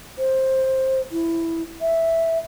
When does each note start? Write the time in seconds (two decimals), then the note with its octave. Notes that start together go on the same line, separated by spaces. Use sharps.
0.18 C5
1.11 E4
1.81 E5